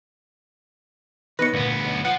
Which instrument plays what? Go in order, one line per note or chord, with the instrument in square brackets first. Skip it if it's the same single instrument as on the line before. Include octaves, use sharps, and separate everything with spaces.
[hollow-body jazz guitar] D#3 B3 C#5 [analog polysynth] B4 [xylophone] A#6 C#7
[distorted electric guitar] D2 B3 [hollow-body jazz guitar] A#2 A#3
[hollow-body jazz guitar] B1
[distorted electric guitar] F3 [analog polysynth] F#5